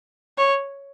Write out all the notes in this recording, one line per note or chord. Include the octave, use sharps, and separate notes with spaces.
C#5